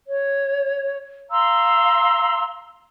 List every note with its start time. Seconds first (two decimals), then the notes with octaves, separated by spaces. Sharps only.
0.07 C#5
1.31 F5 A#5 C6 E6